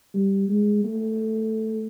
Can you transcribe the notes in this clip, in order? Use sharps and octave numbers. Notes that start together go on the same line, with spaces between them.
G3
G#3
A3